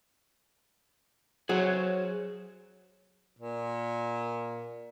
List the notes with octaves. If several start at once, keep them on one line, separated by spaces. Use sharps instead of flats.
F#3 G#4 C5 C#5
A#2